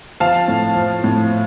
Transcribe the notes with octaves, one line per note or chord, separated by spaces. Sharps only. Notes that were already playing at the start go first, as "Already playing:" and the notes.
F3 F5 A5
A2
F3
A2